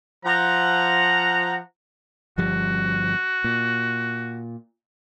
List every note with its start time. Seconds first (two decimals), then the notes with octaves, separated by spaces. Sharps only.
0.25 F3 F#5 A#5
2.38 G1 F3 G3 F#4
3.44 A#2